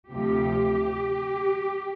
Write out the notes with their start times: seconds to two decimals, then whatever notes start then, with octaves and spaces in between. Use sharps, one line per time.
0.12 D2 C3 F3 G4